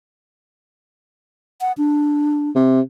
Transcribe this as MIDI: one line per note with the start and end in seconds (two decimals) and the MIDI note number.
1.61 1.72 78
1.78 2.50 62
2.56 2.81 48